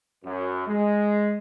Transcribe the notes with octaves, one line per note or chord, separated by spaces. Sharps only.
F#2
G#3